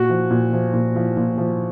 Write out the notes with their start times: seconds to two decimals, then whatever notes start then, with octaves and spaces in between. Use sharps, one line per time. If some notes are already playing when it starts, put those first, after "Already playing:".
Already playing: A#2 F#4
0.09 F3
0.30 A#2
0.53 F3
0.74 A#2
0.96 F3
1.17 A#2
1.38 F3